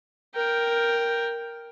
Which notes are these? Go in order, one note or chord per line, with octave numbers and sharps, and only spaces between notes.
A#4 G5